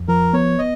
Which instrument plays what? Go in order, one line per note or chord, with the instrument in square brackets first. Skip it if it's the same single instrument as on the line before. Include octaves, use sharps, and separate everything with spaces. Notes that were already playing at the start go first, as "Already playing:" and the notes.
Already playing: [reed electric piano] F2
[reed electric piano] F3 [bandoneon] A#4
[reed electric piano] B3 [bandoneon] C#5
[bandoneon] D#5